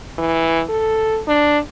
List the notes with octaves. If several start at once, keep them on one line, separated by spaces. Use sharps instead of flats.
E3
A4
D4